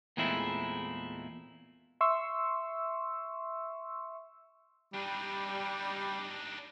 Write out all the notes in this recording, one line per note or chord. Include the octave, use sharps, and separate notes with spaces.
E2 A#2 G#3 A3 C4 E4
E5 C6 C#6 E6
G3 D4 D#4